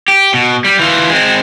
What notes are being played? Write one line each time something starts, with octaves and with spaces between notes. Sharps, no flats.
G4
B2
G3
E3 F4
G#3 C4